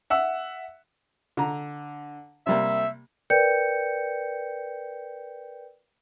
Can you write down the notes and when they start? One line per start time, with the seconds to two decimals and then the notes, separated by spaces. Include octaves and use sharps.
0.10 E5 F#5 E6
1.37 D3 A#5
2.47 C3 G3 A#3 E5
3.30 A#4 B4 D5 G5 G6 C#7